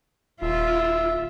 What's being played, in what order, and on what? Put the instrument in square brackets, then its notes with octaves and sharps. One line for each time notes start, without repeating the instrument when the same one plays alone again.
[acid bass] D#1 [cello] F4 [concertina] E5